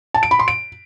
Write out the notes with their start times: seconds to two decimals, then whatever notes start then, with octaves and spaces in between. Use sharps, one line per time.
0.14 A5
0.23 D7
0.31 B5
0.39 C6
0.48 D7